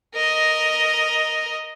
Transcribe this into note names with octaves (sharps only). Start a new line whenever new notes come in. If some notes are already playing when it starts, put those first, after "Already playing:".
A#4 D#5